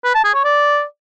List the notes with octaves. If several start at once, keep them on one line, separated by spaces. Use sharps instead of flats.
B4
A5
G#4
C#5
D5